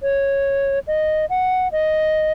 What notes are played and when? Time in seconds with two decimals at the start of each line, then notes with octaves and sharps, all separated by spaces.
0.03 C#5
0.87 D#5
1.30 F#5
1.72 D#5